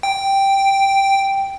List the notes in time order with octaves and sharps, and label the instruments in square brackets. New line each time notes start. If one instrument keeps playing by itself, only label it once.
[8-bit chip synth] G5